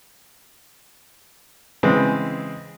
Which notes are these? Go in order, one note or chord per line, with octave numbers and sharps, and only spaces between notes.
C#3 E3 G#3 C4